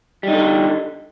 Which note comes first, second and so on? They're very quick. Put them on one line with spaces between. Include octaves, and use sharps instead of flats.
G3 D#4 D3